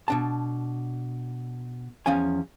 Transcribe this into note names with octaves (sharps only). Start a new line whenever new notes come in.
B2 D4 A5
E2 F3 C#4 F5 G#5